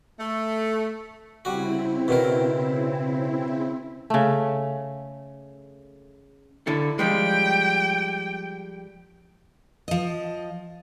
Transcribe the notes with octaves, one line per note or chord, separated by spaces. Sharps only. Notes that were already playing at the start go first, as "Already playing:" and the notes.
A3
C#3 G3 C4 E4 F#4
B2 D#3 A#4
C#3 A3
D3 E4 A4
F3 G3 G#3 G5
F3 D#5